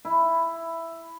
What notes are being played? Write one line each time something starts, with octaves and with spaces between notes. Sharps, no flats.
E4